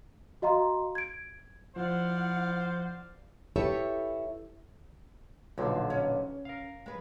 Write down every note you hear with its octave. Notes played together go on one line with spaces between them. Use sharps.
F#4 D#5 F5 A#5 C6
G#6 D7
F3 E4 C5 D5 F5 F#5
E4 G4 A4 B4 C#5 E5
B1 A#2 D3 F3
C#4
A#4 F5
G#3 B4